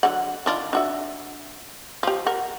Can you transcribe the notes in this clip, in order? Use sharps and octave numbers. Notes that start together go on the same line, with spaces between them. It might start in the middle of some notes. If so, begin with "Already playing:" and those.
D3 F#3 F#5
D#3 D4 F4
D4 F#4 E5
F3 G4
A#4 F#5